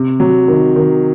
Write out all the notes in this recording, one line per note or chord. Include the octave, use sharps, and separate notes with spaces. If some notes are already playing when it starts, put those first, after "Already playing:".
Already playing: C3
F#3
D#3
D#3